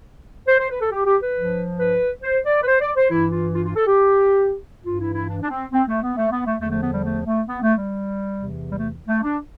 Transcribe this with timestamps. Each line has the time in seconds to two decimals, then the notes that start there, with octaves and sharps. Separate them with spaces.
0.48 C5
0.59 C5
0.70 B4
0.81 A4
0.92 G4
1.06 G4
1.21 B4
1.35 G2 F3
1.79 B4
2.23 C5
2.45 D5
2.63 B4
2.67 C5
2.81 D5
2.97 C5
3.11 G2 E3 E4
3.32 F4
3.55 F4
3.65 F4
3.76 A4
3.87 G4
4.86 G2 E3 F4
5.00 E4
5.14 E4
5.29 D4
5.42 D4
5.50 C4
5.72 C4
5.88 A3
6.02 B3
6.17 A3
6.31 B3
6.46 A3
6.60 E2 D3 F3 A3
6.71 A3
6.82 B3
6.93 G3
7.04 A3
7.26 A3
7.48 B3
7.62 A3
7.77 G3
8.35 E2 C3 E3
8.72 G3
8.79 A3
9.08 A3
9.23 D4